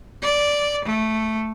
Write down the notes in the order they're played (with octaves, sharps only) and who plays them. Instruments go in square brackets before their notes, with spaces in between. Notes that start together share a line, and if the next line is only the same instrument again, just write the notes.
[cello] D5
A3